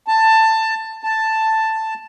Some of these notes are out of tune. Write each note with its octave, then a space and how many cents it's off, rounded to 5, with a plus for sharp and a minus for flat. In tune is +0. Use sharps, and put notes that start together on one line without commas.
A5 +15
A5 +5